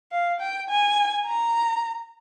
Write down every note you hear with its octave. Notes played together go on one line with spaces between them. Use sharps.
F5
G5
G#5
A#5